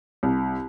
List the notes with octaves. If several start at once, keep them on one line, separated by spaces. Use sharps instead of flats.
C2